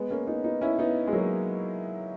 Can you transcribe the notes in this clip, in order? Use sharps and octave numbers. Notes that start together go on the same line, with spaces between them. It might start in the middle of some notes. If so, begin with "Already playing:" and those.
Already playing: G#3 B3
A#3 C#4
B3 D#4
B3 D#4
C#4 E4
B3 D#4
G#3
F#3 A#3